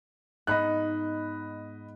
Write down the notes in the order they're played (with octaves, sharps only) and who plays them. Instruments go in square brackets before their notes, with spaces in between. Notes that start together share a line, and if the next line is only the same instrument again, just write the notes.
[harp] G#2 B3 D#4 [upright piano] D#5 B5 F#6